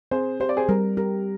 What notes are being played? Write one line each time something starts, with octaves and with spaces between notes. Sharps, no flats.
C4 G#4 C5
G4 C5
D5
G#4 C5
G3 A#4
G4 A#4